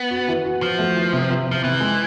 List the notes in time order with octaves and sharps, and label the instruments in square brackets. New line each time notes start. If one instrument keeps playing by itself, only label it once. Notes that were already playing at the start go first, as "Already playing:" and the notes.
Already playing: [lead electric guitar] B3
[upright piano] F#4
E3
F#4
[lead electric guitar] F3 [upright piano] F#4
[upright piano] A3
E3
C3
C3
[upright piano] C3 [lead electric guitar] F3
[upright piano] C3 [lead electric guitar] E3
[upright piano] G#3